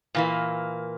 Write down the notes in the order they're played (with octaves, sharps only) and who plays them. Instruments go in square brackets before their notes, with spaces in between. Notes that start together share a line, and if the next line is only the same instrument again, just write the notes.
[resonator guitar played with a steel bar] A#2 E3 A#3